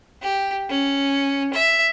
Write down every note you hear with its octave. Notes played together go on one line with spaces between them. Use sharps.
G4
C#4
E5